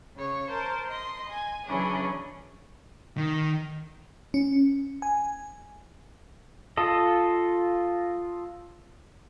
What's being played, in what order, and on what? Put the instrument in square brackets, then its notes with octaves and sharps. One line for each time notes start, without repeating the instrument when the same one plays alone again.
[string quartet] C#3 C#5
A#4 C5 A5
D#5 C6
G#5
C#3 E3 F#3 C#4 D4 G#4
[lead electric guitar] D#3
[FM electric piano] C#4
G#5
[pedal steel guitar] F4 A4 D#5